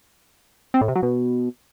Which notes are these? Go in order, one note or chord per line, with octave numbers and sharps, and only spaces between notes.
C4
A2
C3
F#3
B2